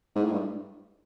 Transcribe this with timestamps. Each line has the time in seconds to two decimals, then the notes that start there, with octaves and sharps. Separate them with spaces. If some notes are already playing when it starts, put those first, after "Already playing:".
0.15 G#2
0.24 A2
0.32 G2